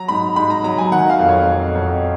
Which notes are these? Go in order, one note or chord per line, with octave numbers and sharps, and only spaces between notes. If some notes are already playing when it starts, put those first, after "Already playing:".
Already playing: F#3 A#5
G#2 B5
G#2 B5
A#5
F#3 A#5
G#5
D#3 F#5
F5
F2
C#5
F2
F2